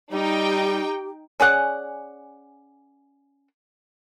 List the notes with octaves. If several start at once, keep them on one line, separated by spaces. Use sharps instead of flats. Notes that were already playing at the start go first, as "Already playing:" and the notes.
G3 D#4 G4 G5
C#4 G#4 D5 F#5